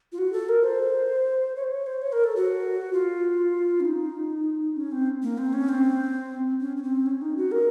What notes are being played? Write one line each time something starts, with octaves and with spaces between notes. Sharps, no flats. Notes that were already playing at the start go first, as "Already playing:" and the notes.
F4
F#4
A4
A#4
C5
C#5
C5
C#5
C5
C#5
A#4
A4
F#4
F4
C#4
D#4
C#4
C4
A#3
C4
C#4
C4
C#4
C#4
C4
C#4
D#4
F#4
A#4